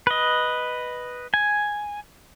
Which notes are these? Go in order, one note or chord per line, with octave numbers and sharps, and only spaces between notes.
B4 D#5
G#5